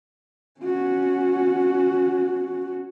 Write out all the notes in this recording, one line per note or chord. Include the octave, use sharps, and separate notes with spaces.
C#4 F#4